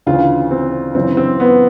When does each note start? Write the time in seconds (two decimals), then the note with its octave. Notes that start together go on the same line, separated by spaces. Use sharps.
0.06 D2 C#3 E3 F4
0.51 C4
0.95 F#2 C#3 E3 C4
1.17 C4
1.40 B3